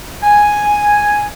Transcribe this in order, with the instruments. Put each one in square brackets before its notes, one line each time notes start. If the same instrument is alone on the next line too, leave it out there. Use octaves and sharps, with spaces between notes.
[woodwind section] G#5